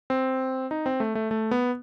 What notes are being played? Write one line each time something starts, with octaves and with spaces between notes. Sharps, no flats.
C4
D#4
C4
A3
A3
A3
B3